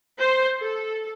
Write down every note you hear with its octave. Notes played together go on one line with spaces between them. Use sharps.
C5
A4